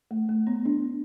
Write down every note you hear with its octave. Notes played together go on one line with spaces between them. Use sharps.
A3
A3
B3
D4